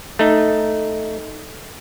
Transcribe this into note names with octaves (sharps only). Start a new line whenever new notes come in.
A3 D#4